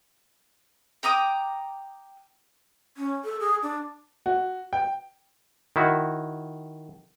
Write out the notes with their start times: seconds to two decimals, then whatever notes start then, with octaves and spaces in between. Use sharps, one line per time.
1.03 G5 A#5 D6 D#6
2.97 C#4
3.24 A4
3.40 G#4
3.63 D4
4.26 F#4
4.73 G5
5.76 D#3 E4 F#4